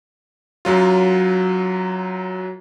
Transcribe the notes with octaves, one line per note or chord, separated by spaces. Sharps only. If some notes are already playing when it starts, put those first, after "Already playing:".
F#2 F#3 F4